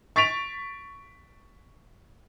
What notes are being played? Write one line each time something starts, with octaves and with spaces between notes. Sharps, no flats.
C#6 A6 B6 D7 F7